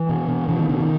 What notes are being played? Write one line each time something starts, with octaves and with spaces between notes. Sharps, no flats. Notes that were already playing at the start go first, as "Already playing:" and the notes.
Already playing: E3
B2
B2
B2 E3
D#3
B2 D3
D#3